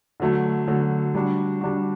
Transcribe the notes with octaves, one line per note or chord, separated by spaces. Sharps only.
D3 F#3 A3
D3 F#3 A3
G3 D4 F#4
G3 D4 F#4